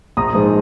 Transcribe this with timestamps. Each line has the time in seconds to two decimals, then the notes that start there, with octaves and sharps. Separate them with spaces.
0.17 A#1 A#5 D#6
0.35 G#2 F3 G#3